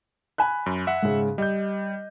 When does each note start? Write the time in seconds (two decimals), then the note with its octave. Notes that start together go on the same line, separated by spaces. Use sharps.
0.38 G#5 B5 F#6
0.66 F#2
0.87 E5 F#5
1.03 G#2 C#3
1.38 G3 D#5 G6